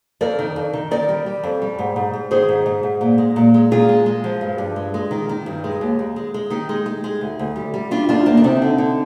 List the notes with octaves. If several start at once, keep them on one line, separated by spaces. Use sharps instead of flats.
F2 A#4 D5
D#3
F2
D#3
D#3 A#4 D5
G3
G3
F2
G3
G#2
G#2
G#2
D#3 G#4 C5
G#2
G#2
G#2
A#2
G#3
A#2
G#3
A#2 F4 G#4
G#3
G#3
F3
G2
G2
G#3
G#3
D#3
D#3
G2
G#3
D#2
D#2
G#3
G#3
D#3 D#4 G4
G#3
G#3
G#3
D2
D2
G3
G3
G3 D4 F4
D2 D4 F4
D2 A#3 D4
D4
C3 C4 D#4
D3
D3